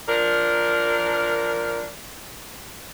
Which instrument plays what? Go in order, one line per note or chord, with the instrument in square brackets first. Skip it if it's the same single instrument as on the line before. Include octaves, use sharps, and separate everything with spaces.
[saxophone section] F3 D4 A#4